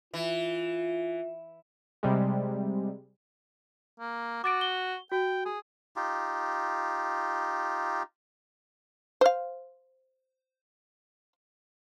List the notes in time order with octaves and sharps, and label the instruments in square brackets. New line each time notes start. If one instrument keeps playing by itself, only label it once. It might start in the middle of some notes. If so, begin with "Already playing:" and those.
[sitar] E3 [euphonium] F4
[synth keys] C3 G3 G#3
[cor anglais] A#3
[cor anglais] F#4 [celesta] D6 A6 D7
[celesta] G7
[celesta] F#4 [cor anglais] G5
[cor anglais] G#4
[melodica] D#4 F4 G4
[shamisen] C5 F5